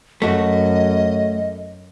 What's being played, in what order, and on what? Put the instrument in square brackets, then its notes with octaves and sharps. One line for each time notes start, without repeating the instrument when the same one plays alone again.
[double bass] F#2 [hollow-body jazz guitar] A3 F#4 [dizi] D#5